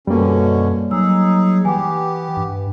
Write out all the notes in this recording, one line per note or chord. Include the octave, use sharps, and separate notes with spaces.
F#2 B2 D3 G3 A#3 C#4
F#3 D#4 G#4 E6
E3 B3 G4 G#5 D6
G2